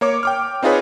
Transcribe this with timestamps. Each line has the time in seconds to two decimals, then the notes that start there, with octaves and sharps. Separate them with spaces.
0.01 A#3 C#5 D6
0.23 G5 D6 F6
0.63 C4 D#4 F4 G#4 B4 C#5